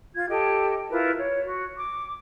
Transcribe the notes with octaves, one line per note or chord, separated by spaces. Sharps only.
F4 G#6
G4 A4 D#5
E4 F4 A#4 B4
C#5
F#4
D6